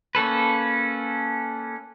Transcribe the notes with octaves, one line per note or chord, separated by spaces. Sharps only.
A#3 C#4 A4 B4